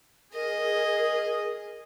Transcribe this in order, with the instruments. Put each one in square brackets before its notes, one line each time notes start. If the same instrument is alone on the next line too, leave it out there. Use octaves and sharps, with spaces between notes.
[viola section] G#4 [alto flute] A#4 [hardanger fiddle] D#5